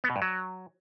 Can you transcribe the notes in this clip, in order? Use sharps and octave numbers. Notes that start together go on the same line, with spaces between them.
B3
B2
G2
F#3